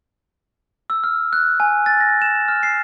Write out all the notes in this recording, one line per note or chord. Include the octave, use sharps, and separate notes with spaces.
E6
F6
F#6
G#5
A6
A#6
E7
F6
C7